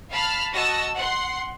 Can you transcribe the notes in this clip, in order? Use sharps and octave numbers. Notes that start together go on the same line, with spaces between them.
F5 A5 B5 F6
F#4 D#5 A5 E6 A#6
F#5 C6